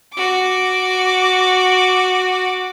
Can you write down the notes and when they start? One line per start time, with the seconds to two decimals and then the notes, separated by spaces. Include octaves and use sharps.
0.14 F#4 D6